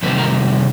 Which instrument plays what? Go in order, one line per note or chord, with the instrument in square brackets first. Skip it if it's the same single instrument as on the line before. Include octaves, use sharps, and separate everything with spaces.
[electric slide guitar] C3 D#3 G3 C4 B4
A#4